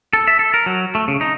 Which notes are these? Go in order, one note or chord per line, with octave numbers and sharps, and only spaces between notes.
A4
E5
A4
A#4
F#3
A3
C#3
D#4